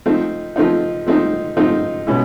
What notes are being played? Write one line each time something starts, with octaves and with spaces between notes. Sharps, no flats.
F3 A3 C4 D#4
F3 A3 C4 D#4
F3 A3 C4 D#4
F3 A3 C4 D#4
B2 G#3 C#4 E4